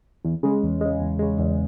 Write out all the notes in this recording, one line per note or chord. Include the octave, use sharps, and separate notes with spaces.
E2
C#3 G#3
E2
C#3 G#3
E2
C#3 G#3
E2